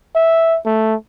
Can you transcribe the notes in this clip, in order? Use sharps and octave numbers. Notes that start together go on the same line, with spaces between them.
E5
A3